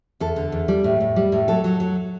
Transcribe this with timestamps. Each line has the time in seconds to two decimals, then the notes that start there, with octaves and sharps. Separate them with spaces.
0.20 E2 A4
0.36 D3
0.52 E2
0.68 G3
0.84 A2
1.00 A2
1.16 G3
1.32 A2
1.48 F#3 A4
1.64 F#3
1.80 F#3